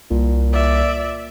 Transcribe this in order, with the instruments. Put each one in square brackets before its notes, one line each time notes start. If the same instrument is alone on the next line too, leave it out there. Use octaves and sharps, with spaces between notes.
[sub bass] C2 [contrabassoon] A#2
[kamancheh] D5 E5